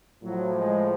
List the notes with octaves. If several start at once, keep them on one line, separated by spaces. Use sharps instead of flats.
A2 F3 F#3
G#3